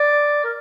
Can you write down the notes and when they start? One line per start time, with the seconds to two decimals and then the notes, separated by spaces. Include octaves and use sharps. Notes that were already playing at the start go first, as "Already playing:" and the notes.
Already playing: D5
0.44 A#4